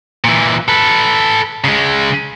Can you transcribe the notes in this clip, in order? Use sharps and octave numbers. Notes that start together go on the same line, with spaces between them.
A#2 E3
A4 B4
C#3 G#3